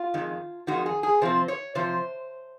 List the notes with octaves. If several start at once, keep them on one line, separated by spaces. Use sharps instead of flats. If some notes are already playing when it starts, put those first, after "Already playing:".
Already playing: F4
F2 D#3 G#3
F2 D#3 G#3 F#4
G#4
G#4
C3 F3 C4 C5
C#5
C3 F3 C5